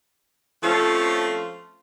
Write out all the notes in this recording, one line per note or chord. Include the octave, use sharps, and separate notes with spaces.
F3 A3 C4 C#4 F4 A4